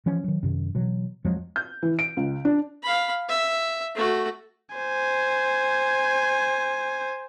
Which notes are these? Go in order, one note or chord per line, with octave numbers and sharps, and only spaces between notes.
E3 F3 C#4
D#3 F#3
F#2 C3 D#3
B2 E3 F#3
F2 F3 F#3 G#3
G6
E3
D7
C#2
D4
F5 B5
E5
A3 F#4
C5 G#5